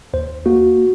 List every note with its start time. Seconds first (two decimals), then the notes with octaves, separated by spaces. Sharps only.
0.13 D#2 C5
0.46 A#3 F#4